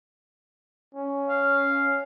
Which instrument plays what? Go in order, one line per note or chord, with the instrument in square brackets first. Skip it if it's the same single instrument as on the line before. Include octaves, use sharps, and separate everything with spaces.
[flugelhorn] C#4
[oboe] F5